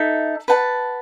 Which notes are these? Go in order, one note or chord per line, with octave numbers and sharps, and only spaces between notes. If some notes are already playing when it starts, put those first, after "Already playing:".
Already playing: D#4 A4 E5
B4 F#5 A5